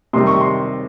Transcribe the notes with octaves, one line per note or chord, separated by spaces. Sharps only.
C3 D#3 G3 C6
C#6
C6